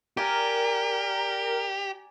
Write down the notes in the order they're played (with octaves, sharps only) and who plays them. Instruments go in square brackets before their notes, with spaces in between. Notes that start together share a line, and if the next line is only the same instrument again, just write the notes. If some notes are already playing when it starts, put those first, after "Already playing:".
[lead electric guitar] G4 [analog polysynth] A#4 [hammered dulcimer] D5 G#5 A#5